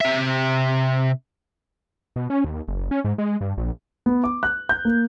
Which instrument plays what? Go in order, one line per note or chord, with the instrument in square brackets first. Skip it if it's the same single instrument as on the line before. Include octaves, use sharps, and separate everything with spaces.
[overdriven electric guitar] C3 E5
[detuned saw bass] B2
C#4
D#2
F#1
C#4
G#2
G#3
G2
A#1
[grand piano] B3
D6
F#6
G6
A#3